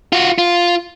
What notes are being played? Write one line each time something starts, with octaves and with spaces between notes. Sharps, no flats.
F4 F#4
F4